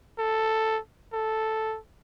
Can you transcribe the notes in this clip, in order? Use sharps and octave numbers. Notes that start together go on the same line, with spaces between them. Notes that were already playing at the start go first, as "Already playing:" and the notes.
A4
A4